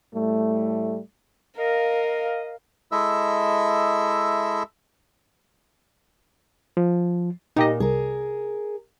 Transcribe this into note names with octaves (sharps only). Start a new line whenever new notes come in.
A2 G3 A3
A#4 D#5 F5
G#3 E4 A4 D#5 E5 E6
F3
A#2 D#4 G4 D#5
C2 G#4 A#4